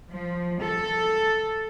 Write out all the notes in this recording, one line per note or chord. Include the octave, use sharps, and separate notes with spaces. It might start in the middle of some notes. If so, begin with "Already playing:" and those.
F3
A4